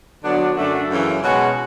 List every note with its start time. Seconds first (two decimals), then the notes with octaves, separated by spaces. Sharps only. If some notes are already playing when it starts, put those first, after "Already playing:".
0.24 D3 F#3 B3 D4
0.56 F#2 D3 A3 D4 F#4
0.90 F#2 C#3 E3
1.23 B2 G#3 C#4 F#4